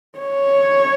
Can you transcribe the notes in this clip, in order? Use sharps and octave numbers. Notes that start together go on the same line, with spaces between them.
C#5